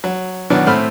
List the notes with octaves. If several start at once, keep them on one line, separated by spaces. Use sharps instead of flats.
F#3
B2 D#3 E3 F#3 B3 D4
A2 A3 C4 B5 F6